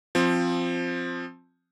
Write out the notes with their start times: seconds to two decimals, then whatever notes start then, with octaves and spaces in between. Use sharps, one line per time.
0.15 F3 C4